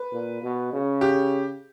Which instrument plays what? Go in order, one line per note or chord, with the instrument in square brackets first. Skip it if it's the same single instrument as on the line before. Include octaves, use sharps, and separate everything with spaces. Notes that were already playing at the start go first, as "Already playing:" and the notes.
Already playing: [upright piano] B4
[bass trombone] A#2
B2
C#3
[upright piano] G4